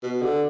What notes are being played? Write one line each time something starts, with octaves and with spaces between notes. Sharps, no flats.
B2
D3